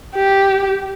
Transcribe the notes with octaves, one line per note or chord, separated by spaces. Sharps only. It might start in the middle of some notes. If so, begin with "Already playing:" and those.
G4